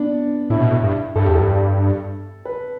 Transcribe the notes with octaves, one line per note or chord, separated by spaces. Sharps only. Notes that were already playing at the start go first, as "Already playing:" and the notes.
Already playing: B3 D4 D5
A2 E4
B2
A2
G2
G2 A4
E2 G4
A4
G2
B4